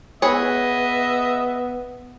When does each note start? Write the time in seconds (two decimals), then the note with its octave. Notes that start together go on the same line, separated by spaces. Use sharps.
0.22 B3 G#4 B4 C#5 D#5 E5